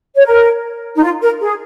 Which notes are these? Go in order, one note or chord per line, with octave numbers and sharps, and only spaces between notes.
C#5
A#4
D#4
F4
A#4
G#4